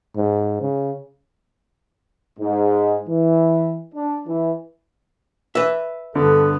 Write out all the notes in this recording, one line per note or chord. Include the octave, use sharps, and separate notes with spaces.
G#2
C#3
G#2
E3
D4
E3
B4 E5
G2 D3 B3 A4